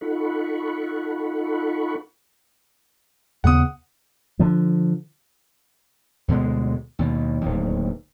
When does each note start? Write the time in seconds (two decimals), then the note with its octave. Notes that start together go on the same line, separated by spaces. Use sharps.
0.01 D#4 F4 A4 F#5 B5 C#6
3.44 D#2 C#3 B3 F#5 D#6
4.39 D3 F3
6.28 D2 B2 D3 G#3
6.99 D#2 B2
7.42 D1 D#2